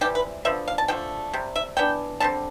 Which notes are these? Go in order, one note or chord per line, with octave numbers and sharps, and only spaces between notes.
C3 E3 G3 G4
B4
D3 F3 B3 E5
F5
A5
D3 F3 A3 G5
C3 G3
E5
E3 B3 D4 G5
D3 G3 C4 A5